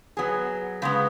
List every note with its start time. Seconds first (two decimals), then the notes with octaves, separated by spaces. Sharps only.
0.17 F#3 B3 G#4
0.82 C#3 G#3 B3